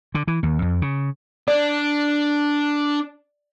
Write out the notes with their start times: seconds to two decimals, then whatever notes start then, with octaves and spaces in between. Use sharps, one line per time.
0.15 D3
0.28 E3
0.43 D#2
0.62 F2
0.82 C#3
1.48 D4 D5